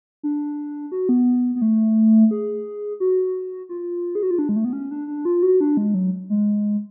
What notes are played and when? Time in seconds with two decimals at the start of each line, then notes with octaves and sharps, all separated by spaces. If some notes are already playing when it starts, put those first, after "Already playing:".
0.23 D4
0.92 F#4
1.09 B3
1.56 B3
1.62 A3
2.31 G#4
3.00 F#4
3.69 F4
4.15 G#4
4.23 F#4
4.31 F4
4.39 D4
4.49 G#3
4.56 A3
4.65 B3
4.73 C#4
4.91 D4
5.07 D4
5.25 F4
5.43 F#4
5.61 D4
5.77 G#3
5.94 F#3
6.30 G#3